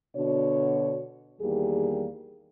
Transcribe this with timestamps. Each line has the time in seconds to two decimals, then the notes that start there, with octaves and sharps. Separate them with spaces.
0.17 B2 D3 D4 F#4 C#5
1.41 E2 D#3 G3 A#3 G4 G#4